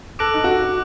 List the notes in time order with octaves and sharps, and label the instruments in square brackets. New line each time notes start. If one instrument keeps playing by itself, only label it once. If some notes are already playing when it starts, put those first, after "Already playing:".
[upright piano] A4 [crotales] D6 F#6 A#6 D7 F#7
[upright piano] D#4
F#4